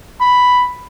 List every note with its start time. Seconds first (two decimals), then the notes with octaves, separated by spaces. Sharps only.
0.21 B5